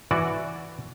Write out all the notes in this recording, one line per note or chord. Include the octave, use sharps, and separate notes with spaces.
E3 F#4 D5